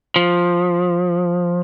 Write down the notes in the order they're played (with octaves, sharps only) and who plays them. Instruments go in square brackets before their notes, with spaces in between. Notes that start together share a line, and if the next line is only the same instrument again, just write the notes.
[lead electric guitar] F3